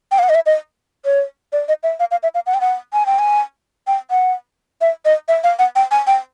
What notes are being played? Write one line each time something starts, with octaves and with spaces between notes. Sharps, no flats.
G5
F5
F#5
D#5
E5
D#5
C#5
D5
D#5
E5
F5
F5
E5
F5
F#5
G5
F#5
G#5
G5
G#5
G5
F#5
E5
D#5
E5
F5
F#5
G5
G#5
G5